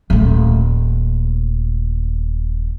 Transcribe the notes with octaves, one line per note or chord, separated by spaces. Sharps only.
D#1 A3